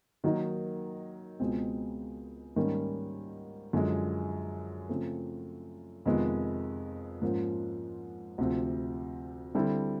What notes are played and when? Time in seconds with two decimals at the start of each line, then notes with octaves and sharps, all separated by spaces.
0.24 D#3 F#3 A#3 D#4
1.40 C#2 B2 G#3 C4
2.56 G#2 D#3 G3 A#3 C#4
3.73 F#2 D3 F3 G#3
4.89 C#3 F3 A3 C4
6.06 F2 C3 D#3 G#3 B3
7.22 G#2 F3 A#3 C#4
8.38 D2 C3 F3
9.55 D3 G3 C4 E4 A4